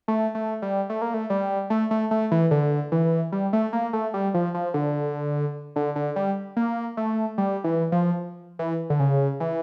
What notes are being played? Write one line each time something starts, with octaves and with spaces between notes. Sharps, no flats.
A3
A3
G3
A3
A#3
A3
G3
A3
A3
A3
E3
D3
E3
G3
A3
A#3
A3
G3
F3
F3
D3
D3
D3
G3
A#3
A3
G3
E3
F3
E3
D3
C#3
E3